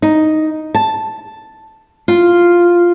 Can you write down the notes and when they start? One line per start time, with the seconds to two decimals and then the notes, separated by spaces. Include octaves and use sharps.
0.02 D#4
0.75 A5
2.08 F4